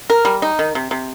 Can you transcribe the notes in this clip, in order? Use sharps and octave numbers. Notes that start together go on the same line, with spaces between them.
A#4
G3
D#4
D#3
C3
C3